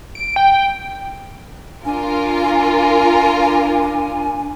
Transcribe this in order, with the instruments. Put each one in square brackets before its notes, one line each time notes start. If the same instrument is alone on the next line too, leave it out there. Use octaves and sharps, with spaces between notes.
[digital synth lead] D7
G5
[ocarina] D4 [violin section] F4 A#4 [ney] G#5